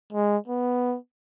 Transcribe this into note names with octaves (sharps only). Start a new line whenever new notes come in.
G#3
B3